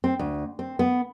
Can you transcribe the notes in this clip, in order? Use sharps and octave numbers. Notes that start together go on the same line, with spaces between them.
C4
D2
C4
B3